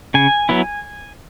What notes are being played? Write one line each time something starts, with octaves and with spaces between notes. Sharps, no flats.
C#3 G#5
F#3 B3 E4